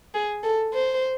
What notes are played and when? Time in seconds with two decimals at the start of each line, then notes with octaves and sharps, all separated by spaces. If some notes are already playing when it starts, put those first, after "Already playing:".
0.14 G#4
0.44 A4
0.74 C5